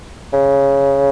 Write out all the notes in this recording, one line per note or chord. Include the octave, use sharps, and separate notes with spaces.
C#3